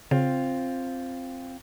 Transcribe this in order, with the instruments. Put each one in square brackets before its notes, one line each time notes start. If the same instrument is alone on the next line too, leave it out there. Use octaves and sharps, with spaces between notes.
[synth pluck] C#3 [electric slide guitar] C4 F4